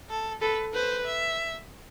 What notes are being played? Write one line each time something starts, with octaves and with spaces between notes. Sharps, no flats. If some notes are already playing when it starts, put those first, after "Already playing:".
A4
A4 B4
B4 C5
E5